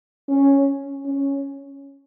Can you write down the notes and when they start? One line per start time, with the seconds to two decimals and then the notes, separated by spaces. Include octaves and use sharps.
0.29 C#4
1.06 C#4